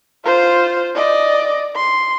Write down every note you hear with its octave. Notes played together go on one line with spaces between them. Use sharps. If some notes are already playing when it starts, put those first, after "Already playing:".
F4 C5
D5 D#5
C6